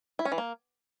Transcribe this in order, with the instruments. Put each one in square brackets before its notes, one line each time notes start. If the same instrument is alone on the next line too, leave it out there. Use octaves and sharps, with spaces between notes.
[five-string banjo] E4
C#4
E3
A#3